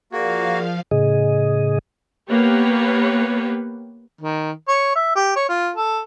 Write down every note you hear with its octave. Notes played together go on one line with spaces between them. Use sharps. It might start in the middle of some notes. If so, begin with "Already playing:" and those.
F3 A#3 F#4 G#4 A#4 D5 F5
A2 C#3 G#4 D#5
A#3 B3 G4 B4 C#5
D#3
C#5
E5
G4
C#5
F4
A4